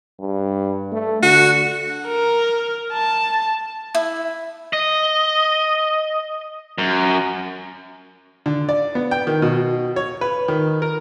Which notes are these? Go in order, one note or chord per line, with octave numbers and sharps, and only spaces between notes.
G2
A3
D3 F#4
A#4
A5
E4
D#5
F#2
D3
D5
B3
G5
D#3
B2
C#5
B4
D#3
A#4